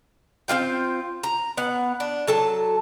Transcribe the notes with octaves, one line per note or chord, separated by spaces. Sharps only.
C4 D4 F4 G5
A#5
B3 F#5
D4
F#3 A4 A5